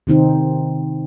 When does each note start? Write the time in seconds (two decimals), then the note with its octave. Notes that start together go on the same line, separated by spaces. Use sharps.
0.07 C3 D#3 C4 D#4